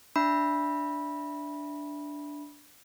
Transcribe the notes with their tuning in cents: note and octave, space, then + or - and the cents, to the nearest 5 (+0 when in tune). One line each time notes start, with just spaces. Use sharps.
D4 -5 E5 +0 B5 -15